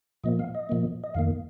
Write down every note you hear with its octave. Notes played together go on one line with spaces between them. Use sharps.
A#2 F3 A#3 D#5
F5
D#5
A#2 F3 A#3
D#5
F2 D#3 A#3 F5